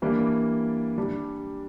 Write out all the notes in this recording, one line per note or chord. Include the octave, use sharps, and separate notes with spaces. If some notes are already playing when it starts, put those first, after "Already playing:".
E3 G3 A#3 D4
G3 D4 G4